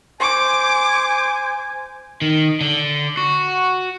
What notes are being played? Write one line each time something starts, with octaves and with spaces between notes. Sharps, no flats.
C5 G#5 D6
D#3
D3
F#4